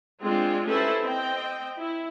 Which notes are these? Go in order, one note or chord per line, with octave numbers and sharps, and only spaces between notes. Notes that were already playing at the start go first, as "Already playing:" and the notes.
G#3 C4 D4 F4
C#4 E4 G4 A4 B4 C5
C4 D#5 G5
E4